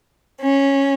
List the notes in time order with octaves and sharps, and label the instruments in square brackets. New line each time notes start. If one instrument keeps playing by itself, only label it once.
[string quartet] C#4